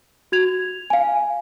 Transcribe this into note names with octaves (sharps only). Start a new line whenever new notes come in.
F#4 G#6 F7
F5 G#5